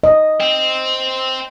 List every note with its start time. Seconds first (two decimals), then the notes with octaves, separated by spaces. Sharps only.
0.04 D#5
0.40 C4